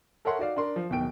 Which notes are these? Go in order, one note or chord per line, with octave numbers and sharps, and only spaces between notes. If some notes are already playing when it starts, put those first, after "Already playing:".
A4 A#4 C#5 E5 F#5 C6
D#4 F#4 D5 F5
D4 A#4 C6
F3
D1 B2 D#3 G5 D7